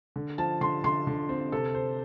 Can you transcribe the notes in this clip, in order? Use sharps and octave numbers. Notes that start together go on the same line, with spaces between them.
D3
F3 A5
D3 C6
D3 C6
D3
C4
C3 A4
C5